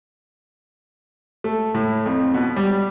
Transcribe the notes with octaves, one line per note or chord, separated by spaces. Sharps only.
A3
A2
F2
B2
G3